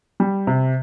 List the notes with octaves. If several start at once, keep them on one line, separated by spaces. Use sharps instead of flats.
G3
C3